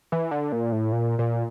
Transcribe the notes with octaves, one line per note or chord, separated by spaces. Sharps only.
E3
D3
A#2
A2
A#2
A#2